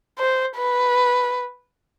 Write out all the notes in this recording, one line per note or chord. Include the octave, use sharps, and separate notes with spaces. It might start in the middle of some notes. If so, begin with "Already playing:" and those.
C5
B4